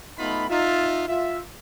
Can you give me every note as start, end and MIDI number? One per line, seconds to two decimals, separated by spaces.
0.18 0.46 57
0.18 0.46 59
0.18 0.46 63
0.18 0.46 65
0.18 0.46 83
0.50 1.04 63
0.50 1.04 65
0.50 1.04 76
1.08 1.40 65
1.08 1.40 76